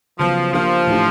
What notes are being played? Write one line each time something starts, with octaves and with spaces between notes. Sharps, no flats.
C#3 F3 F#3 B3
F3 A#3 D4 G4 A#4
A2 E3 A3 D4 G4